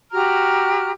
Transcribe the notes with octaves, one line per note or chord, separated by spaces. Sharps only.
F#4 G4 A#5 F6